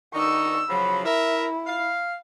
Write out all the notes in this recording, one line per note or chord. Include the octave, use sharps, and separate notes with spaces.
D#3 D4 D#4 C#6 E6
C#3 F3 F#3 B5
E4 A#4 E5
F5